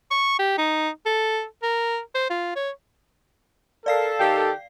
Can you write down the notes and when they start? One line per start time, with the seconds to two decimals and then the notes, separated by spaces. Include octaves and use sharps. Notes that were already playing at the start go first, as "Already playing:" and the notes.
0.11 C#6
0.39 G4
0.58 D#4
1.06 A4
1.63 A#4
2.14 C5
2.30 F4
2.56 C#5
3.86 A4 A#4 D5 F5 C7
4.20 D#3 G4 G5